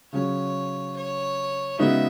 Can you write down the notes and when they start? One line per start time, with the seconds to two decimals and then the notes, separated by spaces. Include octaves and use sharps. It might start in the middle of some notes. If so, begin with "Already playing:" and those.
0.12 C#3 F#3 C#4 C#5
0.96 C#5
1.79 C#3 G#3 B3 D#4 F#4 E5